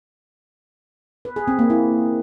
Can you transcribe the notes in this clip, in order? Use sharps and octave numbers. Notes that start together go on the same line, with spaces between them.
B4
G#4
C4
A#3
E4